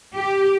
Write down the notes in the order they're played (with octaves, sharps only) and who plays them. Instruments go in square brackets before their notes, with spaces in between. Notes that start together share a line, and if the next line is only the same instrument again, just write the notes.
[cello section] G4